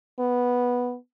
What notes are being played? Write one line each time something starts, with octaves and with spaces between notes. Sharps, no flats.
B3